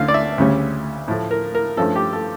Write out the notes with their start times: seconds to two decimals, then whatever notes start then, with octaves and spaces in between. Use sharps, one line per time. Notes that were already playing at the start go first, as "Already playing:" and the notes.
Already playing: D2 D3 A3 C#4 F5
0.08 D5
0.14 E5
0.38 D2 C#3 G3 C#4
1.08 A2 F3 A3
1.31 A#4
1.55 A#4
1.77 G2 F3 A3 C#4 A4
1.95 G4
2.13 A4